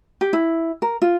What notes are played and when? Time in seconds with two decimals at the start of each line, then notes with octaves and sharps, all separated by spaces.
0.21 G4
0.33 E4
0.82 A#4
1.02 F4